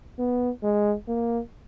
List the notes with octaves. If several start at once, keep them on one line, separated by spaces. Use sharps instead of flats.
B3
G#3
A#3